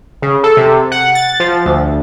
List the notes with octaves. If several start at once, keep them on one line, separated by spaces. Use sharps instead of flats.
C#3
A4
C3
F#5
A6
F3
D2